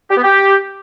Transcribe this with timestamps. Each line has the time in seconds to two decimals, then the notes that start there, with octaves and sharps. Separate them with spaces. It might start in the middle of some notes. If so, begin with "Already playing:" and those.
0.10 G4
0.17 B3
0.24 G4